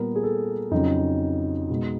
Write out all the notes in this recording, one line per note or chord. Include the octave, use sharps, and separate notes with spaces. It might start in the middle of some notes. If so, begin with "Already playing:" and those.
Already playing: A#2 G3 B3 A#4
G#4
A4
F2 C#3 F#3 D#4
B2 G#3 B3